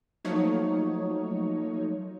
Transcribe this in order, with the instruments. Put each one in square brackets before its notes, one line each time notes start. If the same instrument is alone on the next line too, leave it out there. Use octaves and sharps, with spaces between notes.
[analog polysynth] F3 F#3 A3 A#3 D#4 C#5